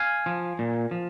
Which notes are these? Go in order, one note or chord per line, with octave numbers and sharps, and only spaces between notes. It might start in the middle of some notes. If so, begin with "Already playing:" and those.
Already playing: F5 G#5
F3
A#2
F3